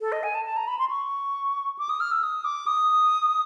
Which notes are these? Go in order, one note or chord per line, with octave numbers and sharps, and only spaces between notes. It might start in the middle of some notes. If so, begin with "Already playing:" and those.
A4
D#5
G#5
A5
A5
A#5
B5
C6
C#6
D6
D#6
F6
E6
D#6
D6
D#6